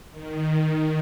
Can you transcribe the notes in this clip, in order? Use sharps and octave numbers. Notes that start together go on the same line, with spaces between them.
D#3